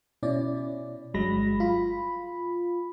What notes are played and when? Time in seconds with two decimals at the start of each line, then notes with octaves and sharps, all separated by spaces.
0.23 B2 C#4 E4 D5
1.14 G1 G2 F#3 G#3 B5 A#6
1.60 F4 B5